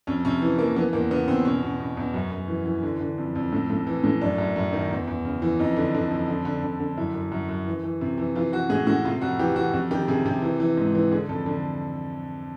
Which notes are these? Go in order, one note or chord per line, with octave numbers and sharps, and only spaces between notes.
F2 C#4
C3 C#4
E3
E3 A#3
E3 B3
E2 A#3
C#3 B3
E2 C4
B2 C#4
B2
B2
E2
F#2
F#2
E3
E3
D3
D3
F2
F2
A2
A2
E3
A2
F#2 D4
F#2
F#2
D#3
E2
E2
C#3
E3
F2 D#4
D3
D3
F2
D3
D3
D3
D3
F#2 E4
F#2
F#2
F#2
E3
E3
C3
E3
E3 F4
E3 F#4
A2 G#4
A2 F#4
C3 F4
F2 F#4
E3 G4
E3 F#4
F2 F#4
D#3 G4
C3 G#4
C3 G4
E3
E3
G#2
E3
D3 G#4
F2 A4
D3